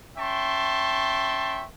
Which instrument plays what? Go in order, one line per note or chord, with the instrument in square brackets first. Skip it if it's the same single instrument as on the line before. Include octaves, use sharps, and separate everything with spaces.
[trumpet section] C#4 E5 G5 A5 C6 C#6